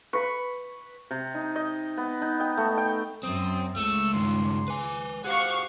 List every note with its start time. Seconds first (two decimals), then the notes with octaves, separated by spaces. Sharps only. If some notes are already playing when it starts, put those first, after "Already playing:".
0.13 B4 B5 C#6
1.11 C3
1.35 D#4
1.56 D#5
1.98 B3
2.22 D#4
2.40 G5
2.57 A3
2.78 G5
3.23 F#2 C4 D#6
3.76 C#2 A3 E6
4.13 G2 D#3 C6
4.68 B4 G#5
5.25 G4 G#4 C5 F5 F#5 C#6